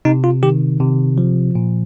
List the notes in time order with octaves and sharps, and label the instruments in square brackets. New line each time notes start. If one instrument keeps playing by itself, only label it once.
[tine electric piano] C3 D#4
F4
D#3 G4
C3
F3
A#2